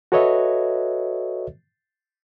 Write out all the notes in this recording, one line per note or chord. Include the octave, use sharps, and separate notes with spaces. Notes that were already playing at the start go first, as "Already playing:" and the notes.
F#4 A4 B4 C#5 D#5 E5